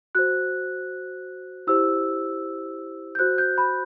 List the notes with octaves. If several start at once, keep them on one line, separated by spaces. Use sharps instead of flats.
F#4 C5 F#6
E4 G4 C5 E6
G6
F#4 C5 F#6
G6
B5